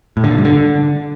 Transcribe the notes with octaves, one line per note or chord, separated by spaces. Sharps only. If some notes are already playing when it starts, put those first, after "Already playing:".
A2
D3
A#2
G2
D3